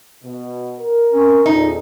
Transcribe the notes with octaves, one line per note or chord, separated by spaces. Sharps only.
B2
A#4
C4 C#4
E2 A#2 D#3 C4 D#4 A4